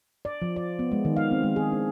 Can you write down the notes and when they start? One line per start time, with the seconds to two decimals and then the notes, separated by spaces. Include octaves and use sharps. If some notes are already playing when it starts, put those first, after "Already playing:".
0.25 D5
0.42 F3
0.56 D5
0.79 B3
0.92 G#3
1.05 D#3
1.17 F5
1.31 C4
1.43 G#3
1.56 G#4
1.72 D4